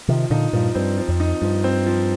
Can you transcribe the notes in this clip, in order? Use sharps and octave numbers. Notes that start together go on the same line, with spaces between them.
C3 D#3 F3
A#2 D3 D#4
G2 A#2 F3
G2 C4
F3
F2
D#4
G2 F3
C4
F3